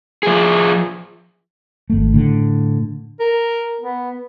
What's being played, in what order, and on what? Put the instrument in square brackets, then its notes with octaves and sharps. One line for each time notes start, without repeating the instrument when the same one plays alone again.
[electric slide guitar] F3 G#4
[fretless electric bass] G#1 A3
A2 D3
[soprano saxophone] A#4
B3